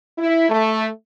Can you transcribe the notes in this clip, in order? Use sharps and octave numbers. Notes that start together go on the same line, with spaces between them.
E4
A3